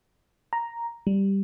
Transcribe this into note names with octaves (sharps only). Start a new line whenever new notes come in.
A#5
G3